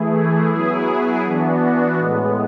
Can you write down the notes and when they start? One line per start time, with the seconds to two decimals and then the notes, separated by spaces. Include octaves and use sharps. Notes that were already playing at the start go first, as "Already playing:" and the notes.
Already playing: E3 A3 E4 G#4
0.52 F#3 B3 E4 G#4
1.26 E3 B3 D4 F#4
2.00 A2 G#3 B3